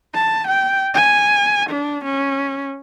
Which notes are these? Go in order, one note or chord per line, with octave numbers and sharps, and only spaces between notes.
A5
G5
G#5
D4
C#4